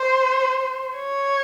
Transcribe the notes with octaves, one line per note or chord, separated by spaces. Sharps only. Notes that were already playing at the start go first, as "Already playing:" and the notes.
Already playing: C5
C#5